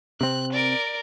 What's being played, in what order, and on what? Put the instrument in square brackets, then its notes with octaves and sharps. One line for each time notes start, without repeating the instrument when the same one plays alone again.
[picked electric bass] C3 C4 [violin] F#6
[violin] A#4 D5